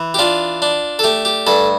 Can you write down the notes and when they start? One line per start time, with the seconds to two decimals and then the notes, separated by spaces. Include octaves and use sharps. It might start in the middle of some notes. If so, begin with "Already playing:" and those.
Already playing: E3
0.14 G4
0.19 D4 F4
0.62 D4
0.99 A4
1.04 A3 G4
1.25 G4
1.47 G2 A4